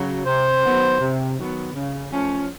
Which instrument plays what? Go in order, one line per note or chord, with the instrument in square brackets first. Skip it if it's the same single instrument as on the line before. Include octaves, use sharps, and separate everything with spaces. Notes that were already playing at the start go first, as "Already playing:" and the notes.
Already playing: [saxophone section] C#3 F#3
[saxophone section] C3 [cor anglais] C5
[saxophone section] D#3 F#3 B3
C3
D#3 F#3 B3
C#3
F3 A3 C#4